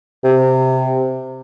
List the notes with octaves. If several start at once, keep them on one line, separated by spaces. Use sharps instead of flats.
C3